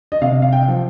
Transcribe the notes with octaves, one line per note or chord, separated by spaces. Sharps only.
D#5
C3 F5
F5
G5
F3